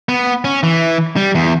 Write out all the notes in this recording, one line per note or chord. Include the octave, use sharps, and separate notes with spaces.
B3
C#4
E3
G3
E2